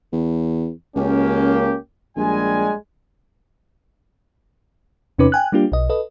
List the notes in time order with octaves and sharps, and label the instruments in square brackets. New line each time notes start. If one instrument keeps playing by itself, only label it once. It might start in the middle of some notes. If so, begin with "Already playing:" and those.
[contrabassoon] E2
[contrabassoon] C#2 [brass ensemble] A#3 C#4 G4
[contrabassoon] A#1 [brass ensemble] G3 G#3 G#5
[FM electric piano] E2 C3 C#4 D#4 B4 D6
G5 G#5 F#6
G3 A#3 D4 F4 G4
B1 D#5
A4 B4 D#5